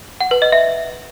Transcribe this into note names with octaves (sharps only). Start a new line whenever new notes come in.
F#5
B4
D#5
E5